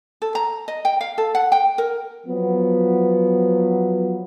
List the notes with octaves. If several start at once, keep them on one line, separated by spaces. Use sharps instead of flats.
A4
A#5
D#5
G5
F5
A4
F#5
G5
A#4
F3 F#3 B3